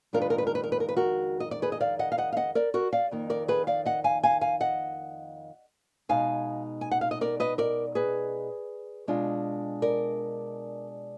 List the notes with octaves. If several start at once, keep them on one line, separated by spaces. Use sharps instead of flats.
F2 D#3 G#3 D4 F4 A#4
B4
A#4
B4
A#4
B4
A#4
B4
A#4
B4
F#4 A#4
D#5
D5
G#4 B4
D#5
D5 F5
D#5 F#5
F5
D#5 F#5
F5
D#5 F#5
A#4 D5
F#4 A#4
D5 F5
F2 D#3 A#3 D#4
A#4 D5
G#4 B4
D5 F5
D#5 F#5
F5 G#5
F5 G#5
F5 G#5
D#5 F#5
B2 G#3 D#4 F5 G#5
G#5
F#5
F5
D#5
A#4 D5
B4 D#5
A#4 D5
G#4 B4
B2 G#3 D4 F4
A#4 D5